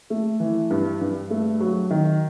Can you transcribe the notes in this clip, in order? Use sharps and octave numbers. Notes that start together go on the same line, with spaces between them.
A3
E3
G2
G2
A3
F#3
D#3